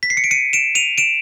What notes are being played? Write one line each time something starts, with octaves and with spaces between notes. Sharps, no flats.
B6
C7
C#7
D7
C#7 D#7
D7 E7
D#7 F7
D7 E7